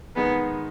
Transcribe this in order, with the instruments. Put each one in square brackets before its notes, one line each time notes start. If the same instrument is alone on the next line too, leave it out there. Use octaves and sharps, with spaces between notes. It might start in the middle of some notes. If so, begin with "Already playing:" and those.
[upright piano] D#3 G#3 D#4 G#4 B4 [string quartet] B3